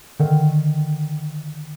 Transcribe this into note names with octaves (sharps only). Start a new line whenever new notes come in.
D3 D#3